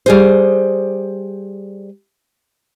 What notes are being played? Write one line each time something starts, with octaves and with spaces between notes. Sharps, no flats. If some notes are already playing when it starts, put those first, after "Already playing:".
G3 G#4 C5